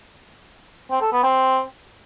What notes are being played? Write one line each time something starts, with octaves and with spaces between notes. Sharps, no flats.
C4
A4
B3
C4